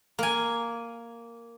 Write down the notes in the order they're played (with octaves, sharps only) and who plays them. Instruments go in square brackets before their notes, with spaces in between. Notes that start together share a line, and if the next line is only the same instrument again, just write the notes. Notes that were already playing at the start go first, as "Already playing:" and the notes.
[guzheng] A#3 G#5